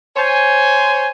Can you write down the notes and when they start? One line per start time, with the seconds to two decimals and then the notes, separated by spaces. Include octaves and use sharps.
0.17 C5 C#5 G#5